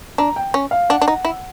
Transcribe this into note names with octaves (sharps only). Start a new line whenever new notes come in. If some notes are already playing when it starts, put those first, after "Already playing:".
D4 A#5
G5
C#4
F5
D4 F#5
D4
D#4
E4